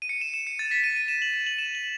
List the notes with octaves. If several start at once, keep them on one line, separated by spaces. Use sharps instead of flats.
D#7
C#7
E7
E7
C#7
A6
B6
D#7
D#7
E7
F#7
E7
F#7
E7
F#7